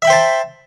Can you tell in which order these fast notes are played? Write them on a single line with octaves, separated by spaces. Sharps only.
E5 B5 G5 C5 A5